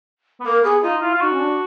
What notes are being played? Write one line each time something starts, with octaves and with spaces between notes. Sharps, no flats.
B3
A#3 A#4
B3 G#4
D#4 F4
E4 F4
F4
D#4 F#4
C#4
D4